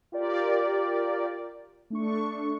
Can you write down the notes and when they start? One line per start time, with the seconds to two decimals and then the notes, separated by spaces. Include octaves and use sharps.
0.12 F4 G4 A#4 D5
1.90 A3 D4 C#6